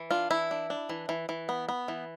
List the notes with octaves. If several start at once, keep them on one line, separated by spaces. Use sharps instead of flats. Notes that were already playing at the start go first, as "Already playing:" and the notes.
Already playing: E3
D4 F4
E3 E4
D4
D4
E3
E3
E3
B3
B3
E3